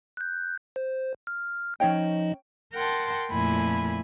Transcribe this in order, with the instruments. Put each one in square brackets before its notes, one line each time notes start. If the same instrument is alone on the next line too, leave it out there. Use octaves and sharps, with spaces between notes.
[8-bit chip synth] F#6 G6
C5
F6
[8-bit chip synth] F3 D#4 D#5 [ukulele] C#4 C#5 G5
[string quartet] A#4 F#5 G5 A5 C6
F2 A#2 A3 E4 G#5 B5